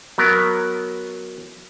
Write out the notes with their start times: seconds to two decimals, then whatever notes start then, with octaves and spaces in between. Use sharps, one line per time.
0.18 F#3 B3 A#4